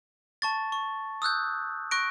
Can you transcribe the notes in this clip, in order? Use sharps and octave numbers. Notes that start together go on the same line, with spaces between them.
A5 C#6 A6
C#6
D#6 E6 F#6 G6
C#6 F#6 A#6 D7